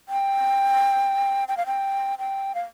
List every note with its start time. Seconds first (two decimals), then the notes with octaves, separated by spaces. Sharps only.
0.09 G5
1.48 G5
1.57 F5
1.66 G5
2.19 G5
2.55 F5